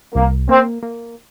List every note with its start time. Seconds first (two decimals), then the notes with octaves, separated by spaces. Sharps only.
0.14 C2 A#3
0.49 A#3 C4
0.83 A#3